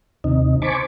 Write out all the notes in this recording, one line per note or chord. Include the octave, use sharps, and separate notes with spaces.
D#2 C3 D#4
C5 G#5 A5 B5 C#6 D6